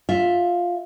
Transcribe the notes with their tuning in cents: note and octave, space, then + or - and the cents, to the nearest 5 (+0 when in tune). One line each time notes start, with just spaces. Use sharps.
F4 +10 E5 +0